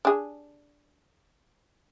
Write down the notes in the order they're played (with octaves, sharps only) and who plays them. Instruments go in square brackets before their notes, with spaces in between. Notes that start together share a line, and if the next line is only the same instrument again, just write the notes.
[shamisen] D4 G#4